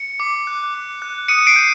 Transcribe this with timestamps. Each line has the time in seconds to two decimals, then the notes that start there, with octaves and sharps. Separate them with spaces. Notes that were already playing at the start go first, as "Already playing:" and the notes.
Already playing: C#7
0.20 D6
0.47 F#6
0.74 D6
1.02 F#6
1.28 D#6 C#7 D#7
1.47 C7 D7
1.56 G6